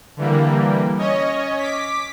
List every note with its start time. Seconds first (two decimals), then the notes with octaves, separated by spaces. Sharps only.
0.17 D3 E3 G3 A#3
0.98 C#4 C#5 D#5
1.58 D6 B6